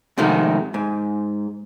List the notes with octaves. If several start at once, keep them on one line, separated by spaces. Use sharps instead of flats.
G#2 C3 D#3 F3 A3
G#2